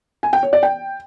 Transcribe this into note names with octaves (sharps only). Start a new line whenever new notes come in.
G#5
G5
C#5
D5
G5